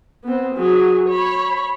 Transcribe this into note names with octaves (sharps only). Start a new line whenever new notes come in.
B3 C4
F#3 G#4
C#5 B5